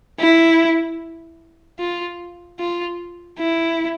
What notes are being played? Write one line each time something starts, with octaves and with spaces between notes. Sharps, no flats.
E4
F4
F4
E4